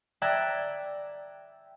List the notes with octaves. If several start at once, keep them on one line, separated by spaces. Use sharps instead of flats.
D5 E5 G5 A#5 F#6 G#6